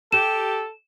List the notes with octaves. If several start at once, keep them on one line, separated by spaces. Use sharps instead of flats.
G4 A4 E7